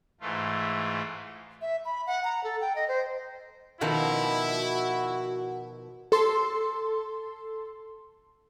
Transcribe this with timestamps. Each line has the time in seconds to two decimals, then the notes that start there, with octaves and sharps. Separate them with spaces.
0.21 G#2 E3 A3 F4
1.62 E5
1.85 B5
2.07 F#5
2.24 A#5
2.44 A4
2.61 G5
2.76 D#5
2.88 C5
3.81 B2 D#3 F3 E4
4.47 F#4
6.12 A4 C6